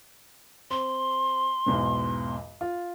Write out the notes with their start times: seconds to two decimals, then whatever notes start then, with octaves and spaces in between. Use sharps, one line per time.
0.70 C4 C6
1.66 B1 E2 G#2
2.61 F4